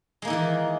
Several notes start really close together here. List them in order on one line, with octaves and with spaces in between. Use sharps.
G#3 A#3 D#4 E3 D#3